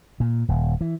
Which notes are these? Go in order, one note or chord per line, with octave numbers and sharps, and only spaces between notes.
A#2
D#1
E3